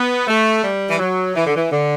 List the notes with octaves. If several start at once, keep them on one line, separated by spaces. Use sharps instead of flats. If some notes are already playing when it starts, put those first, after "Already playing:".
Already playing: B3
A3
G3
E3
F#3
E3
D3
E3
D3